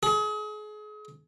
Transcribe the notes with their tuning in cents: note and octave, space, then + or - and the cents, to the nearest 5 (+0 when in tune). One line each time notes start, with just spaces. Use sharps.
G#4 +35